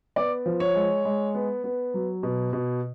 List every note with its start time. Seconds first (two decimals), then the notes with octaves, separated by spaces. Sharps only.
0.16 B3 D5
0.46 F3
0.60 C#5
0.75 G#3
1.05 G#3
1.35 B3
1.64 B3
1.94 F#3
2.23 B2
2.53 B2